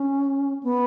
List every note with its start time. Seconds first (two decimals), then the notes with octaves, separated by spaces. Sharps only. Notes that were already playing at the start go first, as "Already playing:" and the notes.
Already playing: C#4
0.63 B3